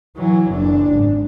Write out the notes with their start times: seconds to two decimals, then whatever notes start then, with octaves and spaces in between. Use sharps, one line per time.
0.16 E3 F#3
0.52 F#1 D4
0.94 G#1